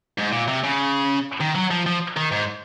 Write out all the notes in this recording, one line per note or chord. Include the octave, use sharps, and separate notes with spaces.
G#2
A#2
C3
C#3
D#3
F#3
F3
F3
D#3
G#2